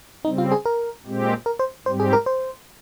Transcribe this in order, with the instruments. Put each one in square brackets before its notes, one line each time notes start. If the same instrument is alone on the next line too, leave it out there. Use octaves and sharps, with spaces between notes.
[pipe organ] C#3 G3 C4 [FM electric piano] D#4
[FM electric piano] F4
G#4
A#4
[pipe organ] A#2 G#3 C4 G4
[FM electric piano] A#4
C5
[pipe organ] G#2 G3 C4 G4 [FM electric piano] C5
[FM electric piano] G#4
A#4
C5